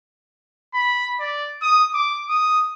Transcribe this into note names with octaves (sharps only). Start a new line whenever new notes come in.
B5
D5
D#6
D6
D#6